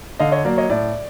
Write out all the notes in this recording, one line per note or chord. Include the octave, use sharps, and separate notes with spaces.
D3 D#5 F5
C#5 D#5
F#3 A#3 D5
C#5 D#5
A2 D5